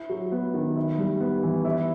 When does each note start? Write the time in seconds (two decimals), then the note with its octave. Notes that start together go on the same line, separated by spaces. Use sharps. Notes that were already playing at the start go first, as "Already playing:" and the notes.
Already playing: E4
0.09 F#3
0.32 B3
0.54 D#3
0.76 E4
0.98 G3
1.20 B3
1.43 E3
1.65 E4